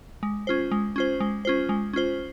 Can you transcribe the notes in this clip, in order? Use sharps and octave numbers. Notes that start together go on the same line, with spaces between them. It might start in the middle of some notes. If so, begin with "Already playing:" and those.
G#3
C#4 F4 C5
G#3
C#4 F4 C5
G#3
C#4 F4 C5
G#3
C#4 F4 C5